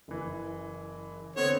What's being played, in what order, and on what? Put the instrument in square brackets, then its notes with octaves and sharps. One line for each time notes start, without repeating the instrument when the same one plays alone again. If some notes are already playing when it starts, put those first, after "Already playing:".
[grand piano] F#1 E3
[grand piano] D3 B3 C4 [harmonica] C#5